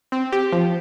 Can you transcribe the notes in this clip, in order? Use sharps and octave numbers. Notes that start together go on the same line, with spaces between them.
C4
G4
F3